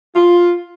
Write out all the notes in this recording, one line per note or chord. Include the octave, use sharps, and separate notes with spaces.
F4